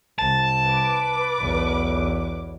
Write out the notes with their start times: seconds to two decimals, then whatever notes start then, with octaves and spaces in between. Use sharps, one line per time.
0.19 C2 A5
0.68 B4 D6
1.40 B1 E2